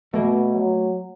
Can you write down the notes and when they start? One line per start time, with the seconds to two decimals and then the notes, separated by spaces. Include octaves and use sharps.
0.14 B2 A3 A#3
0.54 F#3